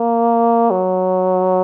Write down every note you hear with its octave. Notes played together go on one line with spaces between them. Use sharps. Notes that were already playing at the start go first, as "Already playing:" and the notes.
Already playing: A#3
F#3